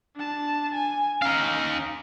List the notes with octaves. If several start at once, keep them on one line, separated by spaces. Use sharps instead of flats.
D4 A5
G#5
C#4 D#4 F5